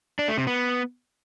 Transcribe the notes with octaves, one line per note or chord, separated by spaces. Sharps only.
D4
A3
C3
B3